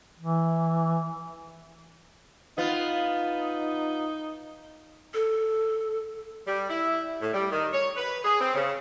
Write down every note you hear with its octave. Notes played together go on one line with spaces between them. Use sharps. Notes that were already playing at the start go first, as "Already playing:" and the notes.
E3
B3 D#4 F4
A4
G3
E4
A2
G3
D#3
C#5
B4
G#4
C4
C#3